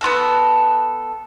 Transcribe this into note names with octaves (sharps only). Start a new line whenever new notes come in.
B3 F4 F#4 A4